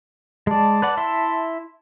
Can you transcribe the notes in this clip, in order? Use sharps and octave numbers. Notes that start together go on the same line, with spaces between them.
G#3 D5 A5
B4 D5 F#5
E4 E5 C6